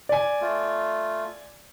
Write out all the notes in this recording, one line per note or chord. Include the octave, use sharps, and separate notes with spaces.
D5 G#5
A3 F4